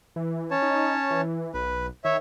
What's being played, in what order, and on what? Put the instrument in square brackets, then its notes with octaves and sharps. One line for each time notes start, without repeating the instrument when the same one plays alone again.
[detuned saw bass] E3
[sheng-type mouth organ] C#4 C#5 A5
[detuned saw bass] D#4
E3
[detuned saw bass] B1 [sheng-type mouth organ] B4
[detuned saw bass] D#3 [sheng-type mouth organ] C#5 E5